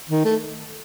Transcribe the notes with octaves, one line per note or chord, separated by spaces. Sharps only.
D#3
A3